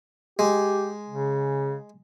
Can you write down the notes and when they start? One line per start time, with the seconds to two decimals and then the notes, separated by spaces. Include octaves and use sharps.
0.39 G#3 G4
1.09 C#3